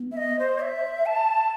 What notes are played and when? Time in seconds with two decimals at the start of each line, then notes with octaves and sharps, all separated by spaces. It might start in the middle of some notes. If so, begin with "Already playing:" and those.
Already playing: B3
0.12 E5
0.17 D#5
0.39 C5
0.61 E5
1.06 A5